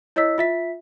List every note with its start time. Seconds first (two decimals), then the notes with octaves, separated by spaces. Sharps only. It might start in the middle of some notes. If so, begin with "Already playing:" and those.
0.16 E4 C#5 D#5 E6 B6
0.38 F4 E5 B6